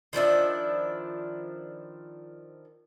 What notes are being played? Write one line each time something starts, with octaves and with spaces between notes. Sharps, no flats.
D#3 F3 D4 E4